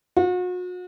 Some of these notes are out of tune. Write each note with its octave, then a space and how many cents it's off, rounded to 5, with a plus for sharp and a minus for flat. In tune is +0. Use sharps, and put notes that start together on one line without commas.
F#4 -40